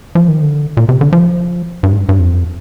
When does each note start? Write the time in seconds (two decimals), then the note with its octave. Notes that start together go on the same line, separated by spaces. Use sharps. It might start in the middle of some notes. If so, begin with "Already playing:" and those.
0.15 F3
0.28 D#3
0.42 D3
0.77 A#2
0.89 C3
1.01 D3
1.13 F3
1.83 G2
1.91 G#2
1.99 G2
2.09 G2
2.19 F2